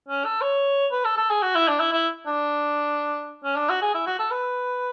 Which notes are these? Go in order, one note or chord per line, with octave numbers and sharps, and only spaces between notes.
C#4
A4
C#5
B4
A4
A4
G#4
F#4
E4
D4
E4
E4
D4
C#4
D4
F#4
G#4
E4
F#4
A4
B4